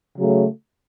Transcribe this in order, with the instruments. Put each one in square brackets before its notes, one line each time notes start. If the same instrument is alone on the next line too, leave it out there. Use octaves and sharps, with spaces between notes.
[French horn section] C#3 F#3 A3